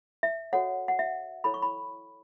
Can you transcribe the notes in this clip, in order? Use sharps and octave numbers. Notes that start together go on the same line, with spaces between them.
E5
F#4 A4 C#5 F#5
F#5
E5
E4 A4 C#5 B5
C#6
B5